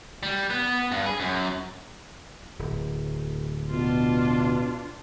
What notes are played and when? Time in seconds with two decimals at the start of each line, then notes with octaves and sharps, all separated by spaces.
0.23 G3
0.50 B3
0.92 G2
1.06 G#4
1.20 F#2
2.59 D1
3.70 B2 D4 F4